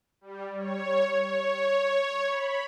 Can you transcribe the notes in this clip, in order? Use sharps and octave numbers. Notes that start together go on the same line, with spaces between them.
G3
C#5
C#5
B5